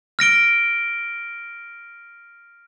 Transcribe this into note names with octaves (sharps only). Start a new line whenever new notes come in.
F6 A#6 D7 G7